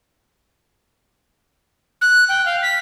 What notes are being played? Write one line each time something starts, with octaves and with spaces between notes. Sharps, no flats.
F#6
G5
F5
B6